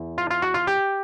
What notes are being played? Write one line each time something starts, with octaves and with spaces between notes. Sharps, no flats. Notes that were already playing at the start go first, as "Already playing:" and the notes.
Already playing: E2
F4
F4
F#4
F4
G4